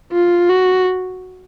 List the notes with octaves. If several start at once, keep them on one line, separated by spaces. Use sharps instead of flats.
F4
F#4